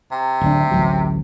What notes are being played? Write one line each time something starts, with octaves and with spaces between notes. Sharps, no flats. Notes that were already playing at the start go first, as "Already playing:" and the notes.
C3
D1 D2 D4
A1 D2 F#3